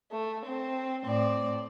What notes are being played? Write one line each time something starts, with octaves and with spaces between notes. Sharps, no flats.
A3
C4
A2 C4 D5